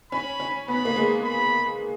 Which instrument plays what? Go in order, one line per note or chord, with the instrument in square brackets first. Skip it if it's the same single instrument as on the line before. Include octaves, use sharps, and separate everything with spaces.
[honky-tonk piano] C#4 [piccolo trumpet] B5
[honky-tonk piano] C#4
[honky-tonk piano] B3 [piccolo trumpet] B5
[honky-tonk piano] A#3
G#3
[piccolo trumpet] B5